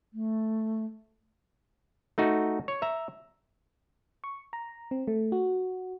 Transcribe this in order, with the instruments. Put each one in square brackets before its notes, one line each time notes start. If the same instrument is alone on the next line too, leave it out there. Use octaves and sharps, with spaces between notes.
[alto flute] A3
[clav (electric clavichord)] A3 D#4 F#4
C#5
E5 A#5
[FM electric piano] C#6
A#5
C4
A3
F#4